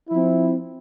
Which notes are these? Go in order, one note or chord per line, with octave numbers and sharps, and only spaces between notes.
F3 C4 E4